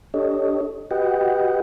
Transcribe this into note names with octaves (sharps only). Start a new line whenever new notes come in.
D4 G4 A4 C#5 D#5
F#4 G4 B4 D#5 F#5 G5